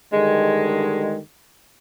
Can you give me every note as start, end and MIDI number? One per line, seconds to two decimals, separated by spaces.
0.13 1.18 43
0.13 1.18 50
0.13 1.18 51
0.13 1.18 56